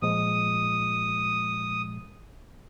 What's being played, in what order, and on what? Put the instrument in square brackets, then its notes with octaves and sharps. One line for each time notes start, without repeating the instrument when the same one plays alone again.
[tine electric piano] A#2 F3 G#3 [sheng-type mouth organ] D#6